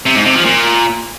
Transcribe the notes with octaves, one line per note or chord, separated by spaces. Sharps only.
C3
G#2
C3
F3
A#2